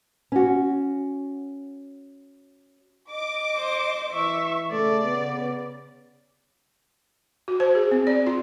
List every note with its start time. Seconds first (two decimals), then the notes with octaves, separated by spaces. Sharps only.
0.32 C#4 F#4
3.11 D#5 D6
3.56 C5
4.13 E3 E5 C#6
4.71 C#3 A3 D5
5.03 B3
7.48 F#4
7.60 C5
7.75 G#4
7.91 C4
8.07 D5
8.27 F4